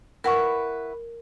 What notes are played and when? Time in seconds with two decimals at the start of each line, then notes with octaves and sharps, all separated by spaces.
0.24 E4 A#4 B4 F#5 C#6